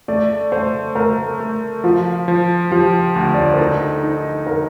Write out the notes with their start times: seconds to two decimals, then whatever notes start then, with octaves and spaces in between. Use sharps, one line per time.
0.08 A3 D5
0.52 A3 C5
0.95 A3 A#4
1.40 A3
1.84 F3 F4
2.28 F3
2.71 F3 G4
3.15 D2
3.34 D5
3.42 C5
3.52 A#4
3.59 D#4 A4
4.04 D#4
4.47 A#4